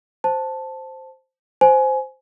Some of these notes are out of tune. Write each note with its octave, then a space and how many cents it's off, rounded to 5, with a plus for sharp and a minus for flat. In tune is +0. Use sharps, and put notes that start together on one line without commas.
C5 +0 A5 +0
C5 -5 G#5 +20